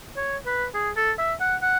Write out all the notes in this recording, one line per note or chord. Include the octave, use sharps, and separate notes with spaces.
C#5
B4
G#4
A4
E5
F#5
F#5